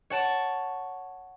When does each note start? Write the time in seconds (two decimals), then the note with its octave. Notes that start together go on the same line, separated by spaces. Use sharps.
0.10 C#5 F#5 A5 D7